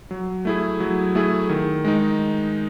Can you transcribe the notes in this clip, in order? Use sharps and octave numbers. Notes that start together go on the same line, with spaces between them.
F#3
A3 E4 G#4
F#3
A3 E4 G#4
D#3
G#3 D#4